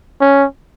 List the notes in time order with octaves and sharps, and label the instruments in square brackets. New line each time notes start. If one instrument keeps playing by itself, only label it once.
[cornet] C#4